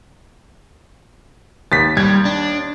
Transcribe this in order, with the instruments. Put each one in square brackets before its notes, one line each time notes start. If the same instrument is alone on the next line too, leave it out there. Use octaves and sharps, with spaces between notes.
[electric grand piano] D#2 [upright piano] A6 B6
[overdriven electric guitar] G3 [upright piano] G#6
[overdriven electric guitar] D4